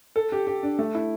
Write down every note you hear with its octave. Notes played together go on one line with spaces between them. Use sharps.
A4
G4
G4
D4
A3
E4